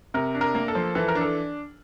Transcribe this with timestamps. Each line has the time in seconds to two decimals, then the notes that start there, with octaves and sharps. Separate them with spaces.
0.14 C3 A#4
0.35 D4
0.41 A#4
0.55 A#3
0.68 A4
0.75 F3
0.95 E3 A4
1.08 A#4
1.15 D4
1.21 A4